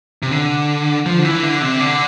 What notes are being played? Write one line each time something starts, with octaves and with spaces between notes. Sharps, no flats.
C3
D3
F3
D3
E3
D3
C3
D3